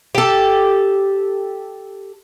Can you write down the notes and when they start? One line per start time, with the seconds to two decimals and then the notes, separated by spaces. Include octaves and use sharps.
0.15 G4 A4